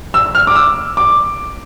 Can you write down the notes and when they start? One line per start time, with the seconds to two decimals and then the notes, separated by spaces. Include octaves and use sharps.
0.14 E6
0.35 F6
0.47 D6
0.56 E6
0.97 D6